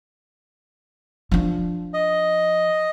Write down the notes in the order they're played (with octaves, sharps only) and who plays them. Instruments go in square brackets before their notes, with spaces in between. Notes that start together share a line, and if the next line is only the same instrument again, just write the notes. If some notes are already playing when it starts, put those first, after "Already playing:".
[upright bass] F3 D4
[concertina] D#5